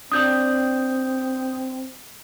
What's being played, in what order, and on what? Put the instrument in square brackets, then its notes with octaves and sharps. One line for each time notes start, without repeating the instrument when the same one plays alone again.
[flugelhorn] C4 [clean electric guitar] D4 G4 D5 [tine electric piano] D#6 G6